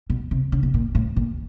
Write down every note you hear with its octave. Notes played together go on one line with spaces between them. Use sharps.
B2
C3
C#3
B2
A#2
A2
A#2